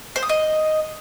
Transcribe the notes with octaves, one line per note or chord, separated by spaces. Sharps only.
C5
D#6
D#5